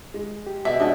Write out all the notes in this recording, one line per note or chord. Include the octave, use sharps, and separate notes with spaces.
G#3
G4
B2 D5 E5 G#5
G#3 C#4 D4 F#4 D#5 E5 A5